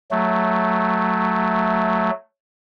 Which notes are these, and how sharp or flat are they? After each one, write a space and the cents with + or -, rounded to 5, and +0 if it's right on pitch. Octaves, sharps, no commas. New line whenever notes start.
F#3 +0 A3 +0